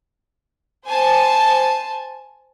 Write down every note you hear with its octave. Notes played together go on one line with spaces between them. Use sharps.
C5 G#5 A5